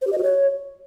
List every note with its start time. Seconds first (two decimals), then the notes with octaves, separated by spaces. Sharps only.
0.02 C5
0.07 G4
0.12 D#5
0.18 F#4
0.23 C#5